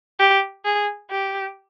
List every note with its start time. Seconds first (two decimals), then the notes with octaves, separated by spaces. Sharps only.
0.19 G4
0.65 G#4
1.11 G4